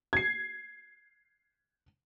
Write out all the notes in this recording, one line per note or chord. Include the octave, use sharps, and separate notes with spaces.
G#6 C7